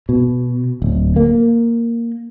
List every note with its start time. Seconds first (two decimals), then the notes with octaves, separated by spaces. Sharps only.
0.09 B2
0.82 D1
1.16 A#3